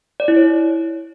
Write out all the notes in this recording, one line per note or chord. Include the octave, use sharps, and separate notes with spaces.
D5
E4
C#5